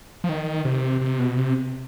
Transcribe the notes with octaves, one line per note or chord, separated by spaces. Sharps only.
F3
D#3
C3
C3
B2
C3